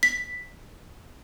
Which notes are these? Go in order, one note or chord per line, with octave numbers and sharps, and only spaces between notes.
B6